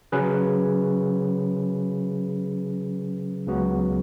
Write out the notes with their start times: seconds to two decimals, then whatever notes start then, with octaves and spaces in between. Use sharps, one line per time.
0.12 C#3 F#3 C#4 G#4 B4
3.47 C#2 C#3 F#3 B3 F#4